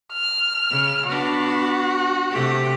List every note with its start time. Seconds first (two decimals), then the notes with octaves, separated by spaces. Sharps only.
0.12 F6
0.70 C#3
1.07 B3 D4 F#4
2.30 C3 A3 G4